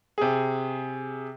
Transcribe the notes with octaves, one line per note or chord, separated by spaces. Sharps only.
C3 G#4